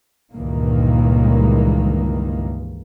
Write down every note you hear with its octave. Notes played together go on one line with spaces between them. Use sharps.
C#2 G2 A#2 D#3 E3 A#3